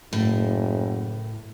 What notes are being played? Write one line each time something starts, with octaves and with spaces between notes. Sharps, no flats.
F#1 A2